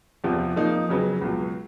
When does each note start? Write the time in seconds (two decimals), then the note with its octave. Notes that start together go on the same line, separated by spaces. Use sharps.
0.24 E2 C3 F3
0.56 F3 A#3 D#4
0.89 F2 C#3 F#3 B3
1.21 C#2 B2 F#3